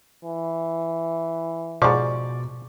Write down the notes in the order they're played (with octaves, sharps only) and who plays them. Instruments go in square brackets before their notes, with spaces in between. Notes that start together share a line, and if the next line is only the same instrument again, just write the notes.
[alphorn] E3
[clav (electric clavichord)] G#2 F3 [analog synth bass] B2 [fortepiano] D5 C#6 D6